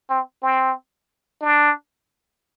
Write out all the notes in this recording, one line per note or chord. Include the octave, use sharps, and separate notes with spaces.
C4
C4
D4